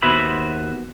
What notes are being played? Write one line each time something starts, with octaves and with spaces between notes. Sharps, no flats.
D#2 B3 F#4 C5 E5 B5